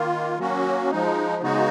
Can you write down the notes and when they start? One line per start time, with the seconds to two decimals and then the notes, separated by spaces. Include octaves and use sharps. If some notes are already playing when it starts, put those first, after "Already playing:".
Already playing: D#3 A#3 F4
0.38 F#3 A#3 C#4 F#4
0.90 F3 G#3 D#4
1.42 C#3 G#3 B3 D#4 F#4